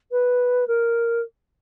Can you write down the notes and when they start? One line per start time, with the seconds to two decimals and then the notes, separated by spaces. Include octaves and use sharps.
0.11 B4
0.67 A#4